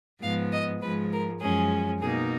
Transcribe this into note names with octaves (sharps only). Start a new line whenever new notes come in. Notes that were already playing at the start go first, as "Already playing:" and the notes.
G#2 F3 B3 F5
D#5
G#2 F3 G#3 B4
A#4
F#2 F3 G#3 C#4 G#4
B2 A#3 D#4 G#4